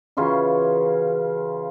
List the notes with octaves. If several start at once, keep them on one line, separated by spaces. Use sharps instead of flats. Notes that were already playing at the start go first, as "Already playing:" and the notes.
C#3 E3 F4 F#4